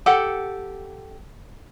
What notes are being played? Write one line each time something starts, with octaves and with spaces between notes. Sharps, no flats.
G4 A4 F#5